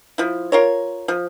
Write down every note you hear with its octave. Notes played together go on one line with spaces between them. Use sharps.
F3 E4
F4 A#4 C#5
F3